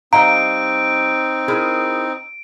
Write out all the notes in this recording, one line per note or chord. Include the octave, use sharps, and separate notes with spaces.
G3 C4 D#4 D#5 F5 A#5 D7
E4 G#4 A#4